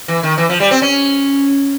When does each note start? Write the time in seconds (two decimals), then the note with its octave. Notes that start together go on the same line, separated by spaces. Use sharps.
0.08 E3
0.23 D#3
0.38 E3
0.50 F3
0.60 G3
0.71 C4
0.82 C#4